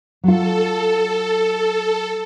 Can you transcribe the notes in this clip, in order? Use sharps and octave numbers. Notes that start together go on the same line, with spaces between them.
F#3 F4 A4